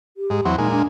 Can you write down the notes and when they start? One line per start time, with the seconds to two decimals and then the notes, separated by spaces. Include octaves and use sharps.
0.17 G4
0.30 G#2
0.45 E2 F#3 C4
0.58 A#2 G#3 D#4
0.72 D4